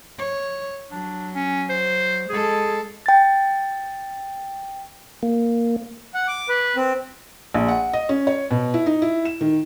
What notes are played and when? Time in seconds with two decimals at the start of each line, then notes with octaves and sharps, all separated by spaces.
0.19 C#5
0.92 F#3 D4
1.35 C#4
1.69 C5
2.29 G#3 G#4 A4
3.06 G5 A6
5.23 A#3
6.14 F#5
6.28 D6
6.49 B4
6.76 C4
7.54 A#1
7.68 F#5
7.93 D#5
8.09 C#4
8.27 C#5
8.51 B2
8.74 E4
8.86 D#4
9.02 E4
9.25 E7
9.41 D#3